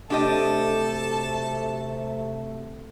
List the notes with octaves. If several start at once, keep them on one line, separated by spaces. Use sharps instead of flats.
C3 F#3 A3 D4 G4 A4 D#5 A5